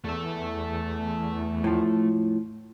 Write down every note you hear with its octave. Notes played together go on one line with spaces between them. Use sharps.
E2 A3 E5
A2 F3